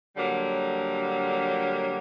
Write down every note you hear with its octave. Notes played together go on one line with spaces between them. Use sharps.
D3 F#3 G3 A#3